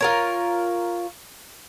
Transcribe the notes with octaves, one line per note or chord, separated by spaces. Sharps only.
F4 A#4 C#5